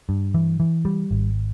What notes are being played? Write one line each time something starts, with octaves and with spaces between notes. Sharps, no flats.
G2
E3
E3
G3
G#1